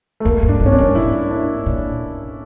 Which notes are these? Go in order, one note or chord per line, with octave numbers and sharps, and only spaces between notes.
A3
F2 A#3
G2
D4
G2
C#4
D4
G2
A2 E4
D4
A#2